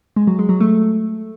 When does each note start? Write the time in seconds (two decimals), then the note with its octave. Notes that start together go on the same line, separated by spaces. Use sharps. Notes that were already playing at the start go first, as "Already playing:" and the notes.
0.16 G#3
0.27 F#3
0.39 G#3
0.49 F#3
0.60 A3